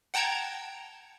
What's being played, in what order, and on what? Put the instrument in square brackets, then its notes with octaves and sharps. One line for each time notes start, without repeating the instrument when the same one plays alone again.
[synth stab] F#5 G5 A5 A#5 G#6